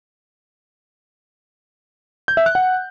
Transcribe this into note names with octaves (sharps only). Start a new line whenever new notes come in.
G6
E5
F#6
F#5